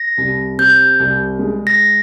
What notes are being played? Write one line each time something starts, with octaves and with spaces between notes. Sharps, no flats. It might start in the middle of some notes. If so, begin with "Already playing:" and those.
Already playing: A#6
C2
C3 G6
C2
G#3
A#6